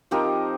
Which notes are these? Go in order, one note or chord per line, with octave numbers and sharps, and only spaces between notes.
F3 C4 D#4 G4 A#4